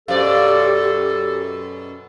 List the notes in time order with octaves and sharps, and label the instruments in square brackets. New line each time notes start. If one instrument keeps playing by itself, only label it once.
[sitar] F#2 B2 D5 [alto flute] G4 [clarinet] A4 [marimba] C5 F5